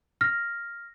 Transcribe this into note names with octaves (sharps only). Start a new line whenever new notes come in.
F6 A#6